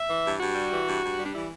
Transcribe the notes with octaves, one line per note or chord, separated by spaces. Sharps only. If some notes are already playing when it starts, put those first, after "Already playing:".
Already playing: E5
E3
G2
G2 F#4
G3
E3
G2
G2
G3
D4
E3 E4